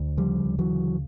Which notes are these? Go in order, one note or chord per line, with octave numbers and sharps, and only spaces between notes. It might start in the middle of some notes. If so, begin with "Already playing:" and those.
Already playing: D2
C#3 F3 G3
D2
E3 F#3
C#3